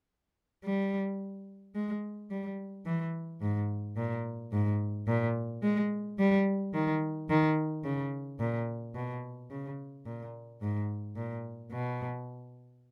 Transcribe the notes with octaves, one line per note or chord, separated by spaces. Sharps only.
G3
G#3
G3
E3
G#2
A#2
G#2
A#2
G#3
G3
D#3
D#3
C#3
A#2
B2
C#3
A#2
G#2
A#2
B2